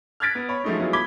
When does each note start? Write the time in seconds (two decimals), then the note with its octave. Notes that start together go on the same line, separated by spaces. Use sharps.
0.20 F6 F#6 G#6 A6 B6 D7
0.35 B3
0.49 C#5 B5
0.64 F3 F#3 G#3 A3 C#4 D#4
0.79 F#3 G#3 B3 E4 F4
0.93 B5 D6 G#6 B6 G7